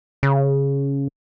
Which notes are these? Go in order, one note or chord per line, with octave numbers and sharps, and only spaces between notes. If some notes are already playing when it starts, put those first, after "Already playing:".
C#3